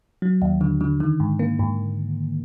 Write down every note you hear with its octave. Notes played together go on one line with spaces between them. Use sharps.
F#3
D#2
D3
D3
D#3
G#2
A#3
G#2